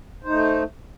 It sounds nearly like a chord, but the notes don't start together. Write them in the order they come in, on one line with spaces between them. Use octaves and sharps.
C5 D#4 A3